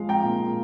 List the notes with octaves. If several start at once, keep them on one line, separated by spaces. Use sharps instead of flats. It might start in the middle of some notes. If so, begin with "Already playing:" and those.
Already playing: F3 G#3 F5
G5 A#5
A#2